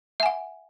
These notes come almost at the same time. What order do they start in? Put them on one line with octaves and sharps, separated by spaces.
E5 G#5 F#5